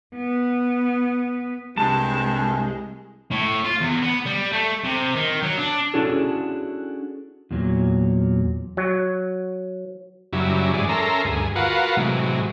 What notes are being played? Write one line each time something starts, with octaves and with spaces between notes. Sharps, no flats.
B3
C2 G2 G#3 A5
A2
F4
E2
B3
G3
A3
C3
D#3
F#3
D4
C#4 D4 E4 F#4 G#4 A4
E2 A#2 F#3
F#3
F#2 C#3 F#3 G3 E4
G#2 E3 G#4 D5
C#4 A4 A#4 E5 A#5 C6
D2 G2 G#4
F4 F#4 A#4 B4 F5 F#5
A2 C3 E3 F#3 G#3